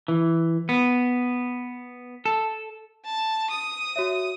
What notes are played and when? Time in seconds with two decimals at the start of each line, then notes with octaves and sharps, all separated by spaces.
0.08 E3
0.69 B3
2.26 A4
3.05 A5
3.50 D#6
3.96 F#4 C#5 E5